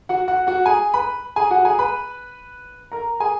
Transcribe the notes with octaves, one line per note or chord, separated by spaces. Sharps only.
F#4 F#5
F#4 F#5
F#4 F#5
G#4 G#5
B4 B5
G#4 G#5
F#4 F#5
G#4 G#5
B4 B5
A#4 A#5
G#4 G#5